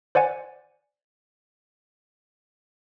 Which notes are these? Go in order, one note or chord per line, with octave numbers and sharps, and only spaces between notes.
C5 D5 F#5 G#5